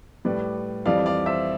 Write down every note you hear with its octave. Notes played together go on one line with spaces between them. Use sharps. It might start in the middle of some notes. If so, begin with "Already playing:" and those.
A2 G3 B4 D5
F2 E3 G3 D5 F5
D5 F5
C5 E5